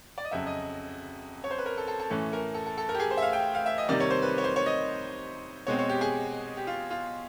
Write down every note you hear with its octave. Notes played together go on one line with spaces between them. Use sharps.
D5
D#5
F2 C#3 F#3 E5
D#5
C#5
C5
B4
A#4
A4
A4
A4
A2 E3 A3 C#4 A4
A#4
A4
A4
A4
A#4
G4
G#4
C5
E5
F5
G5
F5
E5
D#5
C3 D#3 G3 A#3 D5
C#5
C5
B4
C#5
C5
C#5
D#5
B2 G#3 C4 C#5
C#5
G4
G#4
G4
F4
F4